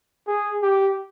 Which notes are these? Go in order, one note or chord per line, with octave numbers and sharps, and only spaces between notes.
G#4
G4